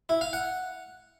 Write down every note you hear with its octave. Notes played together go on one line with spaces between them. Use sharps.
E4
F5
F#5